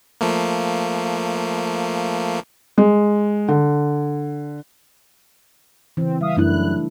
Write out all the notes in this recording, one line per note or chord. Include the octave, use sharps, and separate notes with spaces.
F3 A3 A#3
G#3
D3
C#3 E3 C4
G3 E5 F5 D#6
F#2 A3 D4 E4 F#6